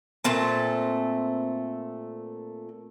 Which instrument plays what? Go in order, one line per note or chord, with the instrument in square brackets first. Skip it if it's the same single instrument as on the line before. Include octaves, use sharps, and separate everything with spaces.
[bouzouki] A#2 A3 C4 A5